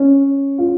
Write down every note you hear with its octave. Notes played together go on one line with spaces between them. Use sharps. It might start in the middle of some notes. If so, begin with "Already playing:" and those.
Already playing: C#4
F4